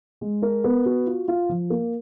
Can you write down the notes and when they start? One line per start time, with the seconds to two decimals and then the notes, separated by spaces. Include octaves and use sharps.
0.21 G#3
0.42 A#4
0.64 B3
0.86 F#4
1.07 F4
1.28 F4
1.49 F3
1.70 A#3